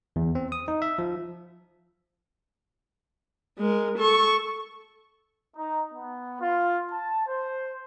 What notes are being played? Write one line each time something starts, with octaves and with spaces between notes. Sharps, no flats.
E2
C4
D#6
D#4
E5
F3
G#3 A#4
A4 C#6
D#4
B3
F4
A5
C5